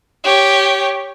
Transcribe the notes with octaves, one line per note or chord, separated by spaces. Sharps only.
G4 C#5